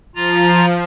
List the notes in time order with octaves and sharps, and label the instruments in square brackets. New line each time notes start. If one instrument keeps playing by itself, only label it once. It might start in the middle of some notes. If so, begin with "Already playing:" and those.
[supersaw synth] F3 [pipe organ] F4 A#5